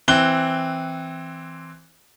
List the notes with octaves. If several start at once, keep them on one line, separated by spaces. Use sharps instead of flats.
E3 C4 F#6 G7